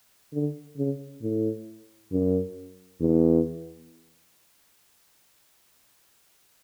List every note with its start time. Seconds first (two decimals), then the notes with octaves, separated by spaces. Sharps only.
0.33 D3
0.78 C#3
1.22 A2
2.12 F#2
3.00 E2